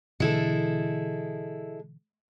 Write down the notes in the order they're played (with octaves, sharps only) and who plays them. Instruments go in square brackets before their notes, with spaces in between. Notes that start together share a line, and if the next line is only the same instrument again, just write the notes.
[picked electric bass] B2 D3 E3 [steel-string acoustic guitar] G#3 E4 A4